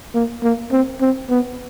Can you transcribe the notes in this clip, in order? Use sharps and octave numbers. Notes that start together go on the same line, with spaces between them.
A#3
A#3
C4
C4
B3